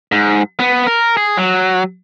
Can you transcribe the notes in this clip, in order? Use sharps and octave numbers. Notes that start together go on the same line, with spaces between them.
G#2
B3
A#4
G#4
F#3